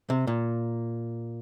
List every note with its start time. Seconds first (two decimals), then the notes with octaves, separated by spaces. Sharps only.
0.10 C3
0.27 A#2